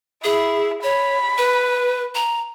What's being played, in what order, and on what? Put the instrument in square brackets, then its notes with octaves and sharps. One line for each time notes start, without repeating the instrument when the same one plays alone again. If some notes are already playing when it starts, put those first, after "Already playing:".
[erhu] E4 [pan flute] G#4
[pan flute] C#5 [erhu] B5
[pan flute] B4
A#5